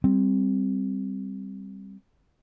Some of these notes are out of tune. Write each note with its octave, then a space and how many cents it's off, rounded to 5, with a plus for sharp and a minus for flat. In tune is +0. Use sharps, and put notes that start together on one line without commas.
G3 +0 C4 +0